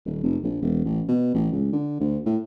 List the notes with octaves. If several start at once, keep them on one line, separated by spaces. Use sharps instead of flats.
D#1
F1
A#1
E1
A1
B2
A1
C#2
D3
D2
A2